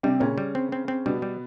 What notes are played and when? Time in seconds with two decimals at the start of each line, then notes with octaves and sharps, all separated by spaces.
0.03 C3 G3 C4
0.20 A#2 C#3 C#4
0.38 G3
0.55 C4
0.72 C4
0.88 C4
1.06 B2 G3 B3
1.22 G3